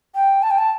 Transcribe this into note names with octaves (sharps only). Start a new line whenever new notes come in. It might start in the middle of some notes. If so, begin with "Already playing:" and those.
G5
A5
G5
A5